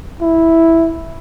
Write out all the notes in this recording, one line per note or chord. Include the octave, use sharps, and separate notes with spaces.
E4